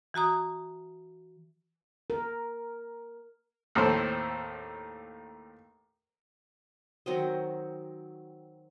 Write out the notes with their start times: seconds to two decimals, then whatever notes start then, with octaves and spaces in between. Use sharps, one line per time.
0.14 E3 F#4 A#5 D#6
2.10 A#4
3.75 D#2 A2 C4 A4 C5
7.06 D#3 F#3 C4 D#5